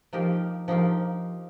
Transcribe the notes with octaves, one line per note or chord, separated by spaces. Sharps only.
F3 D#4 G4 A#4
F3 D#4 G4 A#4